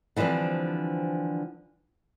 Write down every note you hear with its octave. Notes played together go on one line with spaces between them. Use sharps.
D3 E3 F3 G3 C4